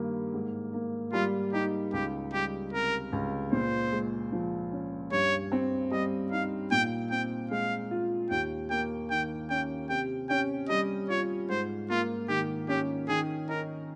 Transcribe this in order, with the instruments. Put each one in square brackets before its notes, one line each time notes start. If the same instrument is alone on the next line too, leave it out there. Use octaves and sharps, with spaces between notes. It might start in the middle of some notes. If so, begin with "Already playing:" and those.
Already playing: [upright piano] G2 D#3 G3 A#3
G#2
A#3
[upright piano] G3 [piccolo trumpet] F4
[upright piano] D#4 [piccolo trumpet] G4
[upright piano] C#2 [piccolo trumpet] G4
[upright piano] G3 [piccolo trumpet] G4
[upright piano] C3 [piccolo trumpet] A#4
[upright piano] C#2
[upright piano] A#2 [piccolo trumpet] C5
[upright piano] G#3
F3
C#4
[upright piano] G2 [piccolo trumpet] C#5
[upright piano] C4
[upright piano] G3 [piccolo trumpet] D#5
[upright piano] D#4 [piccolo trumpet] F5
[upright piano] A#2 [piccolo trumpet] G5
[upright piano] C4 [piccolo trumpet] G5
[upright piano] G#3 [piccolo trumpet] F5
[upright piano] F4
[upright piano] D#2 [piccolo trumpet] G5
[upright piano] A#3 [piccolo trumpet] G5
[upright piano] D#3 [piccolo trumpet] G5
[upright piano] C#4 [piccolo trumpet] G5
[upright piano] C3 [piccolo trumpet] G5
[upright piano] C#4 [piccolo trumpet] G5
[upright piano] G3 [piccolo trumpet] D#5
[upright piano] F4 [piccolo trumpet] C#5
[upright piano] G#2 [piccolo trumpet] C5
[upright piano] A#3 [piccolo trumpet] F4
[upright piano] D#3 [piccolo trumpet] G4
[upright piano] C#4 [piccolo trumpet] G4
[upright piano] D#3 [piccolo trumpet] G#4
[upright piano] D#4 [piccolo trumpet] A#4